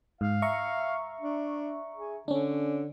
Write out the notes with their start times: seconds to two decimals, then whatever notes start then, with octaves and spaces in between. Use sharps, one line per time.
0.21 G#2 F5
0.42 E5 A#5 C#6
1.21 D4
1.96 G#4
2.28 D3 C#4 D4